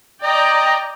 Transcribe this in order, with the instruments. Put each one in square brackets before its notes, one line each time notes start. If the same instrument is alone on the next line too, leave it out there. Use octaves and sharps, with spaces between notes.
[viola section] D5 G5 A#5 [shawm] D#5